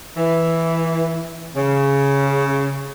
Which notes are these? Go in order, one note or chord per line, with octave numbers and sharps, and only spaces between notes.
E3
C#3